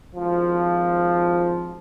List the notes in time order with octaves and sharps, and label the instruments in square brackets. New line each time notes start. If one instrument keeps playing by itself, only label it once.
[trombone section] G#1 F3